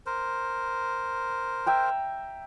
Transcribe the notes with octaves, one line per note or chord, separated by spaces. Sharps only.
A#4 C5
E5 G5 A#5